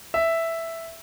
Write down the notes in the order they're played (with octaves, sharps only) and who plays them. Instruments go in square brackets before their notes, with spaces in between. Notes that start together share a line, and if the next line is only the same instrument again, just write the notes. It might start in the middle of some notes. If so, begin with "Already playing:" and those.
[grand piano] E5